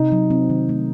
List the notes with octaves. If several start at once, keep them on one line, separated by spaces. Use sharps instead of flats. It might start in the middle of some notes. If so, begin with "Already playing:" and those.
Already playing: C3 D#4
F#3
C4
D#3
A3